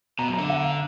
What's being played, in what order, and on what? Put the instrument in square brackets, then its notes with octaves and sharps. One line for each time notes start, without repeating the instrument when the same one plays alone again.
[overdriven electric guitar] B2 [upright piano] A#5
[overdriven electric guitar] F#2
[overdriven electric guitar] D3 [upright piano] A#5
[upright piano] F#5
F5